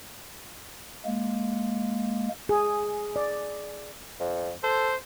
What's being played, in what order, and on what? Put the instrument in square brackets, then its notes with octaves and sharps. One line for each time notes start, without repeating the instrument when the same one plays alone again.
[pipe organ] G#3 A#3
[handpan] G#4
D5
[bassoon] F2
[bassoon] A4 [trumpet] C5